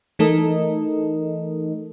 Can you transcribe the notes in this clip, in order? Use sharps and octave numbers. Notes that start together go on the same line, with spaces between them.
E3 A3 D#4 A4 A#4 D#5